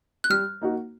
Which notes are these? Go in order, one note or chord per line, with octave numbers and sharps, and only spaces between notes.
F#6
G3 F6
A#3 D#4 F#4